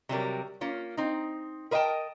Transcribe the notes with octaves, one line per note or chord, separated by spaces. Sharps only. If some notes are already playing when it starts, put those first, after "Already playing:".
C3 F#3 G3 A#4
A#3 C#4 F4
C4 D#4
A#4 B4 D#5 F5 G5 A5